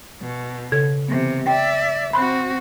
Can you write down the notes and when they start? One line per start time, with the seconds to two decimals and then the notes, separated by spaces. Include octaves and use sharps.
0.21 B2
0.72 C#3 A4 G#6
1.08 C3 E3 B3
1.47 D5 E5 G5
2.13 C4 F#4 B5 C6 F#6